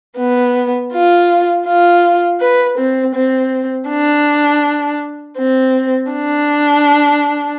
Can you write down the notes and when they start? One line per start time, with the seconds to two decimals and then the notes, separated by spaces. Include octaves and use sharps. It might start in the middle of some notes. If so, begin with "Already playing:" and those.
0.18 B3
0.93 F4
1.67 F4
2.41 B4
2.78 C4
3.15 C4
3.89 D4
5.37 C4
6.12 D4